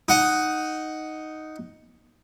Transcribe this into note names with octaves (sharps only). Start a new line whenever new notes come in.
D#4 F#5